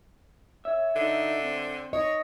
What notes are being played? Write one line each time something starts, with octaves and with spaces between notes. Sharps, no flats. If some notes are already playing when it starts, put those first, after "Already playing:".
C#5 E5
D3 D#4
C4
C#5 D#5